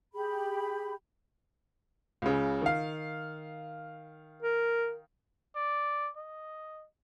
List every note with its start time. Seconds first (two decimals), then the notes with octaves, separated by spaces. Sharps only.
0.14 G4 G#4 B5
2.22 C#2 C#3
2.62 D#3 F5
4.43 A#4
5.55 D5
6.16 D#5